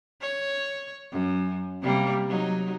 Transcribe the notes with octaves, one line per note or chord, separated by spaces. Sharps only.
C#5
F#2
C3 G3 A#3
F#3 D#4